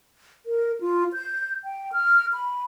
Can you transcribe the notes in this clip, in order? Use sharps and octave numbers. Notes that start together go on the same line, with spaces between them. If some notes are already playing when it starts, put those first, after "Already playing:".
A#4
F4
G6
G5
F6
B5